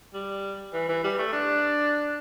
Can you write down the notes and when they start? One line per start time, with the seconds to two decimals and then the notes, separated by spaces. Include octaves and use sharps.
0.14 G3
0.73 E3
0.89 E3
1.04 G3
1.19 A3
1.33 D4